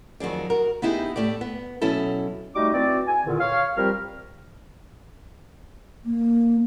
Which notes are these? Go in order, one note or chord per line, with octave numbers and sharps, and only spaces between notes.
F2 D#3 F#3 G#4 D5
F#4 A#4
B3 D#4 E4 G4 G#4
A2 A3 G4 D5
B3
B2 F#3 C#4 E4 A4
G3 A3 D#4 F#4 D#5 D6
E3 C4 F#4 D5
G#5
E2 A#2 D3 D#3
C#5 F5
F3 G3 C4 G4 A#4 F6
A#3